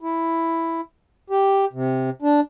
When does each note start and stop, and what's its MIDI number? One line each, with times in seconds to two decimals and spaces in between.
0.01 0.81 64
1.30 1.65 67
1.73 2.10 48
2.22 2.40 62